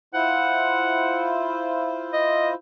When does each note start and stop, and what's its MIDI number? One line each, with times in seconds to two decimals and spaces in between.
0.14 2.54 64
0.14 2.54 65
0.14 2.54 72
0.14 1.35 78
2.13 2.50 75